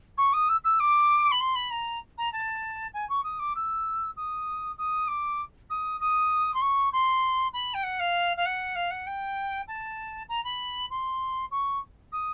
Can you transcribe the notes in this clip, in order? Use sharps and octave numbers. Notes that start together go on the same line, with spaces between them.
C#6
D#6
E6
E6
D6
B5
C6
B5
A#5
A#5
A5
G#5
C#6
D#6
D6
E6
D#6
D#6
D6
D#6
D#6
C6
C#6
C6
B5
G5
F#5
F5
F5
F#5
F5
F#5
G5
A5
A#5
B5
C6
C#6
D#6